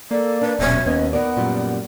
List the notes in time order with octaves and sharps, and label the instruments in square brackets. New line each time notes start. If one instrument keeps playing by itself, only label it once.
[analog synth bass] A#3 [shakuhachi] A4 [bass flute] D5
[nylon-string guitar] D4 [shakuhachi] B4
[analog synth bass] D#1 [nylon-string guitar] F#2 B2 [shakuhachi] C#5 [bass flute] E5
[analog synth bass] D#2 [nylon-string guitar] B3 C#4 D#4 [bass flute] D#5
[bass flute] B3 [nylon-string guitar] D#4 A#4 D5 [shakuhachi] F#5
[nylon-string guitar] F#2 G3 [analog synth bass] A#2